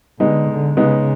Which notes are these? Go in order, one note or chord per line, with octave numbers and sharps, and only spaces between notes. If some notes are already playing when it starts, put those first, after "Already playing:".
D3 G#3 B3 D#4
D3
C#3 G#3 B3 D#4